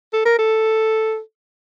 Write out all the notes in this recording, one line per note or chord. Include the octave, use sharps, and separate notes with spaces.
A4
A#4
A4